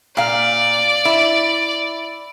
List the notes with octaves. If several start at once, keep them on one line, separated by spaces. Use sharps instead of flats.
A#2 D5 F5
E4